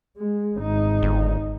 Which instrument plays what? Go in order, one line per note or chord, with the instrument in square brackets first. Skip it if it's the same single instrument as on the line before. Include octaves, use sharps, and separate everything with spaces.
[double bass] G#3
G#1 D#4
[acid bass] G1